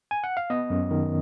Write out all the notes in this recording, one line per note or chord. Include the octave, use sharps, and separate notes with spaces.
G#5
F#5
F5
B3 D#5
F#2
D#3